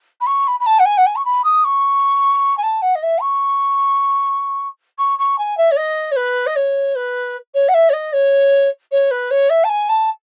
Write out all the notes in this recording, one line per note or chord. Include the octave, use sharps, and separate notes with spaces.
B5
C#6
B5
B5
A5
F#5
G#5
F#5
G#5
C#6
B5
D#6
C#6
G#5
A5
F#5
D#5
E5
C#6
C#6
C#6
G#5
E5
C#5
D#5
C#5
B4
D#5
C#5
B4
C#5
F#5
E5
C#5
D#5
C#5
C#5
B4
C#5
E5
A5
G#5
A5